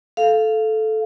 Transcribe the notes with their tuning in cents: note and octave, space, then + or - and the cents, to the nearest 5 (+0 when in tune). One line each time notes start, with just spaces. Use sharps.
A4 -10 F5 -10